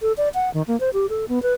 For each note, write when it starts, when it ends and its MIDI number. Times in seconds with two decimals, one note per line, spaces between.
0.02 0.13 69
0.17 0.29 74
0.34 0.52 78
0.54 0.62 51
0.68 0.79 58
0.80 0.90 72
0.93 1.06 67
1.09 1.25 69
1.28 1.42 59
1.43 1.54 71